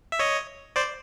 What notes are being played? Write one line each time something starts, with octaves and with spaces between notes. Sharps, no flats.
E5
C#5 D#5
C5 D5